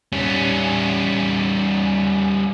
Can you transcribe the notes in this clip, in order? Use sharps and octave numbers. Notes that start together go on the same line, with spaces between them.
G3 C#4